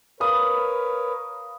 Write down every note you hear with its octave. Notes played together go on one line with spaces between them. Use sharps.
A#4 B4 C#5 F5 B5 D#6